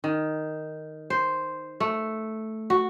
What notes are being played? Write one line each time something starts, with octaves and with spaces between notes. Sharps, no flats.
D#3
C5
A3
F#4